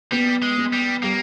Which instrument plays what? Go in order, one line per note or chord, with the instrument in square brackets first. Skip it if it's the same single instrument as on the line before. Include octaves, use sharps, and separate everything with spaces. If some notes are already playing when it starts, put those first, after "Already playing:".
[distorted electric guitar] G3 [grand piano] B3
[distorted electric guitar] G#3
[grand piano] B3
[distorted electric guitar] G3
[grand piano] G3 [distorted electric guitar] A#3